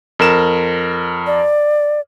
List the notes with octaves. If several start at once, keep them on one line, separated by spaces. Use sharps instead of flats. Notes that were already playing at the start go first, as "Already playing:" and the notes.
F2 A#4 E7
D5